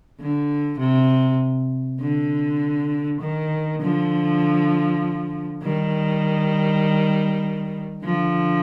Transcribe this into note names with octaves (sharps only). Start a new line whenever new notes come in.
D3
C3
D3
D#3
D3 F3
D#3 G3
D3 F3